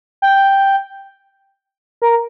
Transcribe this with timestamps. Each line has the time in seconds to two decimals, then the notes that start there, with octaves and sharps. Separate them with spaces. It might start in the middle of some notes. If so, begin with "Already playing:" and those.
0.22 G5
2.02 A#4